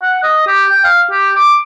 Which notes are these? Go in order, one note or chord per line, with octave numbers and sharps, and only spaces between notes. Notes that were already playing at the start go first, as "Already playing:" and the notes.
F#5
D#5
G4
G5
F5
G4
D6